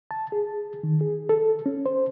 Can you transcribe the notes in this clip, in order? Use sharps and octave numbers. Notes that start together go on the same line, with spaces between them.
A5
G#4
D#3
G#4
A4
C#4
C5